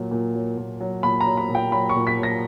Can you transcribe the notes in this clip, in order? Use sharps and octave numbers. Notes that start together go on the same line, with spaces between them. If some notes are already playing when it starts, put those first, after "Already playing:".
Already playing: A#2 F#3
A#2
F#3
A#2
F#3
A#2 B5
A#5
F#3
B5
A#2
G5
F#3 B5
C#6
A#2
B6
F#3
A#6